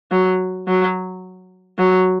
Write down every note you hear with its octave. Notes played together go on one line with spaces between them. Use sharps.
F#3
F#3
F#3